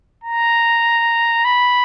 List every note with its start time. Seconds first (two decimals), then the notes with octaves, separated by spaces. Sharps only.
0.24 A#5
1.45 B5